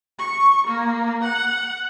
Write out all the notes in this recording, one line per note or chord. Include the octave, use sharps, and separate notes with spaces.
C#6
A#3
F#5